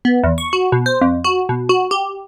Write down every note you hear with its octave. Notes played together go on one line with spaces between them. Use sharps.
B3
E2
C#6
F#4
B2
C5
F2
F#4
B2
F#4
G4